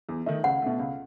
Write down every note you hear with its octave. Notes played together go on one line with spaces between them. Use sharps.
E2
D#3 A3 D#4
C#2 F#5
B2 A3
C#2